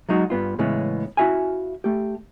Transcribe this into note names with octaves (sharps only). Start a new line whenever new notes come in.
F#3 G#3 D#4 F#4
G2 B3 F4
A2 C#3 E3 G#3 B3 C#4
C#4 E4 F#4 E5 F5 G#5
A3 G4